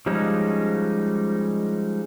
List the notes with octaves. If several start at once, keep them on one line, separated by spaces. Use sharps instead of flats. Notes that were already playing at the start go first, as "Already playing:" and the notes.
F3 G3 G#3 C#4 D#4